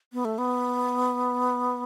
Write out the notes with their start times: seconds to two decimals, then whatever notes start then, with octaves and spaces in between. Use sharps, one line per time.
0.13 B3
0.25 A3
0.38 B3